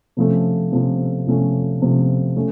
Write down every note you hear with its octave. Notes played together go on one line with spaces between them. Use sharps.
C3 F3 A3 C#4
C3 F3 A3 C#4
C3 F3 A3 C#4
C3 F3 A3 C#4
A3 C#4